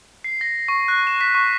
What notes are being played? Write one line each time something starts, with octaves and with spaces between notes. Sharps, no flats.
C7
A#6
C#6
F#6
E7
B6
C#6